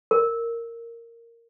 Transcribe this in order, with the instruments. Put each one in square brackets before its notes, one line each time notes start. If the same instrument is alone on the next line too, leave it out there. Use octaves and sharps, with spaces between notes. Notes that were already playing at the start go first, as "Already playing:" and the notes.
[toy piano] A#4